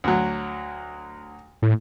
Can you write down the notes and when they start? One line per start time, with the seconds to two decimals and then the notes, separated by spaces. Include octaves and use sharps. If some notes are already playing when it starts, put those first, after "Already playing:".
0.04 D2 F#3
1.62 A2